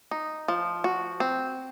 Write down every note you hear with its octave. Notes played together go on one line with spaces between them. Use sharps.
D#4
F3
F#4
C4